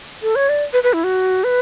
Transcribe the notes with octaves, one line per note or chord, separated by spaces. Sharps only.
A4
C#5
D5
B4
B4
E4
F#4
B4